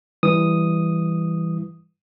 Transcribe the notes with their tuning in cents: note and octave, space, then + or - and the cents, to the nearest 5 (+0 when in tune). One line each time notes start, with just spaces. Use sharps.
E3 +0 G3 +0 D#6 +0